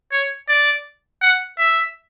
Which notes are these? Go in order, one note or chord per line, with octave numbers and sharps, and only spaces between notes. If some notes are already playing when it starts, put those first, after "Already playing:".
C#5
D5
F#5
E5